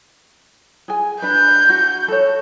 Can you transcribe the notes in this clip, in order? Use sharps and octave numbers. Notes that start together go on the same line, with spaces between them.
G#4 G#5
D4 B4 G6
F#4
A4 C#5